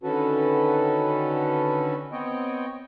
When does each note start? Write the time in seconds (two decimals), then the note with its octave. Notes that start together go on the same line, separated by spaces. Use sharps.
0.03 D3 D#3 C#4 F#4 A4 B4
2.12 B3 C4 C#5 D#5 G5